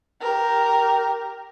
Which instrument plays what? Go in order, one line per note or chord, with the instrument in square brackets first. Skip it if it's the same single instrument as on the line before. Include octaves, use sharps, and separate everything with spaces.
[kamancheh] G4 A#4